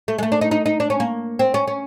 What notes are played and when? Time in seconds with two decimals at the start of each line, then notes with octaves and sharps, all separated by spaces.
0.08 A3
0.18 G#3
0.23 A3
0.32 D4
0.41 D#4
0.51 D#4
0.66 D#4
0.80 D4
0.90 C#4
1.00 A#3
1.39 C4
1.54 C#4
1.68 C#4